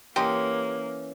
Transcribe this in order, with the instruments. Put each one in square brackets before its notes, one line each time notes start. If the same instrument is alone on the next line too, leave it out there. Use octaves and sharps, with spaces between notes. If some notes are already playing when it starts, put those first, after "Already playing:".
[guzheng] E3 C#4 A#5 [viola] A#3 [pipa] G4 D#5 C6